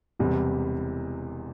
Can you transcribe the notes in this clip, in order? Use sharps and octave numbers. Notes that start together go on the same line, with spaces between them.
E1 E2 C3 G3